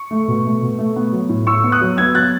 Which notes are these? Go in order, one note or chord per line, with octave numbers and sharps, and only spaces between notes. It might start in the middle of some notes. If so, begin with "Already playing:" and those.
Already playing: C#6
A3
B2
A3
B2
A3
B3
F#3
A2
A2 C#6 E6
B3
D#6 F#6
F#3
B3 E6 G#6
F#3 F#6 A6